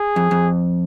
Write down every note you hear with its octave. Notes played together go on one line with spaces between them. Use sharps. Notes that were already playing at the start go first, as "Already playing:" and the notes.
Already playing: G#4
F2
F2